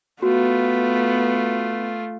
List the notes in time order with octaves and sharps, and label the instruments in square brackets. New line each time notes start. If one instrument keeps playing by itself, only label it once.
[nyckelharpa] A3 F4 [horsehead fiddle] B3 [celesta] F#4